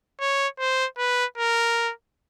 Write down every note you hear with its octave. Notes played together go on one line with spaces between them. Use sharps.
C#5
C5
B4
A#4